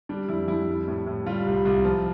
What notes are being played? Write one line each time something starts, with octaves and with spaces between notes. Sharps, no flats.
G3 D4
F2 E4
F2 E4
G3
A2
A2
G3 F4
C2
C2
F3